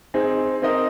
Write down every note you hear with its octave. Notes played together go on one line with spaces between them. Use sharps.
C4 D#4 G#4
C4 D#4 A#4 D#5